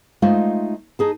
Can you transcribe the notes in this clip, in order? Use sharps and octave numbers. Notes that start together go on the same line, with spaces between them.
G#3 A3 D#4 F4 C5 F5
D#4 G#4 A5